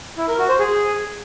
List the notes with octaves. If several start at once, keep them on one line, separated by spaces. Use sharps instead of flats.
E4
A#4
F#4
C5
G#4